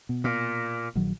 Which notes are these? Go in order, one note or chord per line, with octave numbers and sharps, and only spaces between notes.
B2
A#2
A#1 D#3 F#3